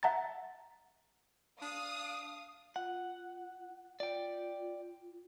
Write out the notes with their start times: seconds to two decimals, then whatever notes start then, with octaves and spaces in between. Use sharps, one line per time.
0.03 E5 F#5 A5 A#5 A6
1.62 D4 F5 D#6
2.76 F4 F#5
4.00 F4 D5 G5